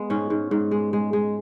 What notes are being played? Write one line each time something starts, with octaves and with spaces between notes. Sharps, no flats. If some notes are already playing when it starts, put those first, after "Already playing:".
Already playing: G#3 B3
G#2 C#4
G#2
G#2
G#3
G#3
G#3